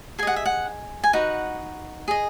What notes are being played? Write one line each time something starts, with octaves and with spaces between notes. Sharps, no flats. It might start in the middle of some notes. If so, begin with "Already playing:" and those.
G#4 D#5 F#5 G#5
E5
F#5
G#5
D#4 F#4 B4 F#5
G#4 D#5